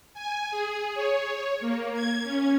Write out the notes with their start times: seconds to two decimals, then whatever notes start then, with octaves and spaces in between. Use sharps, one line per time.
0.14 G#5
0.51 G#4
0.94 C#5
1.60 A#3
1.94 G#6
2.23 C#4